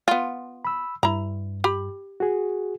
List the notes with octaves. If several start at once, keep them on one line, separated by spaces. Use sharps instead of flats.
B3 F4
B5 E6
G2 E4 A#5
G4 B5
F#4 G#4